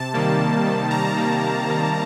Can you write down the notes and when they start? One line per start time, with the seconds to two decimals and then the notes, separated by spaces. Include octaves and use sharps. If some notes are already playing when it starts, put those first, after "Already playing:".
Already playing: C3 A5
0.14 D#3 G3 A#3
0.39 C3
0.65 D#3 G3 A#3
0.90 C3 A#5
1.17 D#3 G3 A#3
1.42 C3
1.68 D#3 G3 A#3